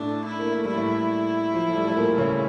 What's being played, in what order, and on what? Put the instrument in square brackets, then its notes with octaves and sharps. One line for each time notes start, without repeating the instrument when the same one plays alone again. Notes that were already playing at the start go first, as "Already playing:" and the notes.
Already playing: [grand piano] A2 A3 [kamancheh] D4
[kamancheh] E4
[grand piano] A#3
A3
[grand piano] G3 [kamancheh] E4
[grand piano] A2 A3
F3
A3
G3
A3
A#2 A#3
C#3 C#4